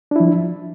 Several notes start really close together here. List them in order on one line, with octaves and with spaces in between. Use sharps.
D4 E4 F3